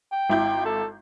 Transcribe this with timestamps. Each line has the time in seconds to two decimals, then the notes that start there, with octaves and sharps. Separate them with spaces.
0.12 G5
0.29 G#1 E4 G6
0.66 A4